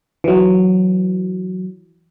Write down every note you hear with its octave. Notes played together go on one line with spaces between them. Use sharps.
E3 F#3